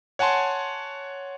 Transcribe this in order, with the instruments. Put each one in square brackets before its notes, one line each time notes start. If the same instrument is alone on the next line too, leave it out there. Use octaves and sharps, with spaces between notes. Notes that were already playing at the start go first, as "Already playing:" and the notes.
[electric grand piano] C#5 F#5 G#5 A5 C6